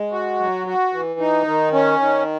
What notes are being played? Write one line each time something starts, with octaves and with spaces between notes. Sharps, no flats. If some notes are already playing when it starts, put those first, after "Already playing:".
Already playing: G#3
F#4
F#3
F#4
E3
D#4
D#3
C#4
D#3